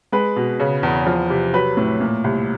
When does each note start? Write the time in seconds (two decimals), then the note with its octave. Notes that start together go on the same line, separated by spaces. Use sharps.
0.12 G#3 B4
0.36 B2
0.60 C#3
0.83 E2
1.06 F3
1.30 C3
1.54 F#3 B4
1.77 A2
2.01 A#2
2.24 C2